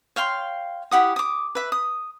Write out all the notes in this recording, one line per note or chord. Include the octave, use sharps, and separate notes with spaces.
C#5 F5 G5 C6
E4 G4 F#5 D#6
D6 D#6
B4 E5
D#6